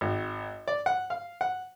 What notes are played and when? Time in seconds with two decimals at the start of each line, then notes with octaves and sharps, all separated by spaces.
0.01 G#1
0.68 D5
0.86 F#5
1.10 F5
1.41 F#5